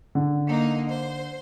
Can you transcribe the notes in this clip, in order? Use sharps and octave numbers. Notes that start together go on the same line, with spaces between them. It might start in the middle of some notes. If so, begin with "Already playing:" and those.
D3
A#3 D#4
C5